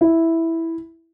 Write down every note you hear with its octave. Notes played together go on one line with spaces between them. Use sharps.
E4